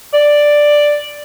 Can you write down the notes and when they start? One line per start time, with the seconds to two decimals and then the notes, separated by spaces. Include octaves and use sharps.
0.14 D5